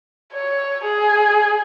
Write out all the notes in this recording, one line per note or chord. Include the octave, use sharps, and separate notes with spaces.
C#5
G#4